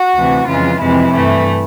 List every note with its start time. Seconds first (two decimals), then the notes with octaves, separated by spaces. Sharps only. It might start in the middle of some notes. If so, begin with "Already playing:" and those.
Already playing: F#4
0.16 D2 C3 E3
0.48 F2 C#3 E3 G#3 F4
0.80 F2 C3 E3 G#3 E4
1.13 G2 E3 A3